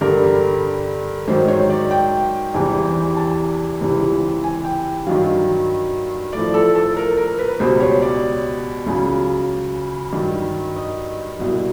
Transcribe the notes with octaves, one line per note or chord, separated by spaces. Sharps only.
G2 D3 G3 A#4
G#2 D#3 F#3 C5
C#5
D5
G5
E2 C3 E3 G3
A5
C#2 C3 E3 G3
G#5
G5
G2 D#3 F#3 F5
A2 F3 D5
A4
A4
A#4
A#4
B4
C#2 B2 G3 C5
C#5
D5
C#2 C#3 F#3
G2 D#3 F#3
D#5
C2 B2 F#3